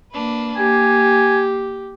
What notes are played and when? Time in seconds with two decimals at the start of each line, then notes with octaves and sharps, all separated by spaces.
0.12 A#3 D4 B4
0.57 A#3 G4 G#5